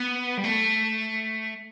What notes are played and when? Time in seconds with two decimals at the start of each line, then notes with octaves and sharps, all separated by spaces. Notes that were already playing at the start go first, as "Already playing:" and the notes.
Already playing: B3
0.38 G3
0.44 A3